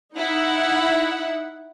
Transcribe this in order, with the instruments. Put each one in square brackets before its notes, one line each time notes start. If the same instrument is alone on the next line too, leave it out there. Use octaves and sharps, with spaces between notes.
[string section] D#4 E4 F#5